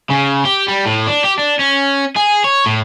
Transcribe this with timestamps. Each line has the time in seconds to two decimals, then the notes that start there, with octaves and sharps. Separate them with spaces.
0.11 C#3
0.45 G4
0.68 G3
0.86 A2
1.07 D4
1.24 G4
1.38 D4
1.59 C#4
2.16 G#4
2.44 C#5
2.66 A2